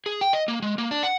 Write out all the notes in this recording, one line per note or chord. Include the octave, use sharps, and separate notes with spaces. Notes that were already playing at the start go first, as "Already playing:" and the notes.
G#4
G5
D#5
A#3
G#3
A#3
D4
F#5